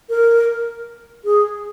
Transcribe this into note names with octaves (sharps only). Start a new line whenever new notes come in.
A#4
G#4